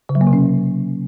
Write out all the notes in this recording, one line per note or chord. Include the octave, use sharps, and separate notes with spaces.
C#3
F#3
A#3
C3
C#4